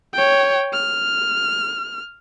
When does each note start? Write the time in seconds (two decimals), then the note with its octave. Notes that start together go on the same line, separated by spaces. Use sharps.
0.14 C#5 G5
0.73 F6